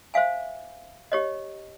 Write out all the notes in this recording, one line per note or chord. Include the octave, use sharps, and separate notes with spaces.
C5 E5 F5 G#5
G4 C#5 D#5